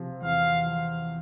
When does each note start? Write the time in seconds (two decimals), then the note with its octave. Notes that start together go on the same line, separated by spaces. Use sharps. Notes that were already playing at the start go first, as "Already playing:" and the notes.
Already playing: C3 F3
0.22 E2 F5
0.66 F3